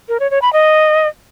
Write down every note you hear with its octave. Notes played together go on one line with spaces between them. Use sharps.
A#4
C#5
C#5
B5
D#5